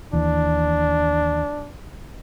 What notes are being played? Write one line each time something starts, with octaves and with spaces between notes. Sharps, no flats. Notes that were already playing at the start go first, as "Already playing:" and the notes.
D#2 E3 D4